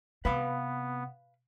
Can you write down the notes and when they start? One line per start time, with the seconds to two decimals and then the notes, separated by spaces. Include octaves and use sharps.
0.25 C3 B3 B4 F5 B5